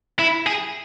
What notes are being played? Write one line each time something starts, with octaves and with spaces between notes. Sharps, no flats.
E4
G#4